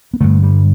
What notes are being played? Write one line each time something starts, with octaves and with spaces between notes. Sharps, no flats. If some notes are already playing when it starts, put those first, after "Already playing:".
B3
G2 D3 A3
G3